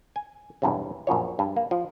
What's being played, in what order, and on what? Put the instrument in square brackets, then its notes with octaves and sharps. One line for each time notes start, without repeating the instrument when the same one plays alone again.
[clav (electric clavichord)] G#5
B1 E2 G2 C3
A#1 F#2 F3 C#5
G2
A#3
F3